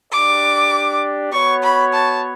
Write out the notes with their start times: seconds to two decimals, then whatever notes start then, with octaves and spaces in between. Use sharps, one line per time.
0.11 D4 G4 D5 D6
1.33 B3 F#4 C#5 C#6
1.64 B5
1.93 A5